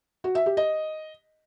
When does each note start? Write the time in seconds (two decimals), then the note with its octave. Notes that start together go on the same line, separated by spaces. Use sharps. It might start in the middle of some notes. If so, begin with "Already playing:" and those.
0.24 F#4
0.35 E5
0.46 G4
0.57 D#5